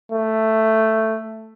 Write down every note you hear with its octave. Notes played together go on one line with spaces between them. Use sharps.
A3